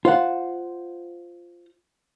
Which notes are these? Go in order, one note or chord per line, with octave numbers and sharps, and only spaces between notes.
F4 C5 F#5